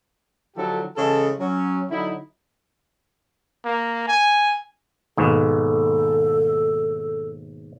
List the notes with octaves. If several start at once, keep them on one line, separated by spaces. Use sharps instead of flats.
D3 F3 F#3 E4 G4 A4
C#3 E3 G#3 A4
F#3 C#4
D3 F#3 D#4 E4
A#3
G#5
D#2 G#2 B2 A4